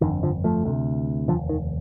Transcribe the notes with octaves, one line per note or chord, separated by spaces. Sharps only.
G1 F2 D3 D#3
D3 F3
F3 A3
D2 C3
F1 D#2 D3 F3
D#3